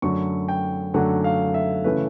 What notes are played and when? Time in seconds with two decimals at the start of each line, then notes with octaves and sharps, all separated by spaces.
0.02 F#2 D3 F#3 A3 C#6
0.48 G5
0.94 F#2 D3 F#3 A3 F#5
1.24 F5
1.54 E5
1.84 C#3 E3 A3 C#4 B4